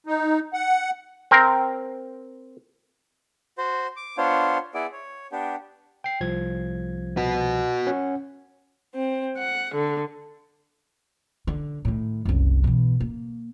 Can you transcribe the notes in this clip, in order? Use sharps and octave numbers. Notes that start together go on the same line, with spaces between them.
D#4
F#5
C4 A#4
F#4 C5
D6
B3 D4 F4 C5 C#5
B3 E4 G#4 D5
C#5
B3 D4 G4
G5 C7
C2 F3 G#6
F#4 B4
C#4 C#5 F#5
C4
F#5
D3
D3
A2 D#3
F#1 C2
B2 E3
A#3